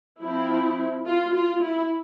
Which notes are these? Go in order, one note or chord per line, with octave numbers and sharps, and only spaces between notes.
F3 C4 E4
F4
F4
E4